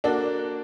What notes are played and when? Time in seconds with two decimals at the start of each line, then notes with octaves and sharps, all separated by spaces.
0.04 A#3 D4 F#4 A4